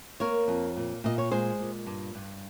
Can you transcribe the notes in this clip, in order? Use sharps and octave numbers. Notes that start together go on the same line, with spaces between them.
A#3 A#4 C#5
F2
A#2
A#2 D#5
C#5
G#3 G#4 C5
A#2
G2
G2